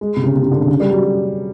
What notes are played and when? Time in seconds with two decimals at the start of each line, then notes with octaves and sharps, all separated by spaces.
0.01 G#3
0.17 C3
0.24 C#3
0.35 C3
0.43 C#3
0.51 D3
0.60 C3
0.68 C#3
0.80 G3
0.91 F#3
1.03 F#3